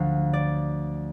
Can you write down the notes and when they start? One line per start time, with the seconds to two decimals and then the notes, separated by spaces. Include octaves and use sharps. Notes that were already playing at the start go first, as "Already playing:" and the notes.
Already playing: D2 D3 F3 F5
0.33 D5